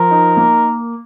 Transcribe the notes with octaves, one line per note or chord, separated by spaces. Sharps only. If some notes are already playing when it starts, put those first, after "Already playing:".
Already playing: F3 A#4
D#4
A#3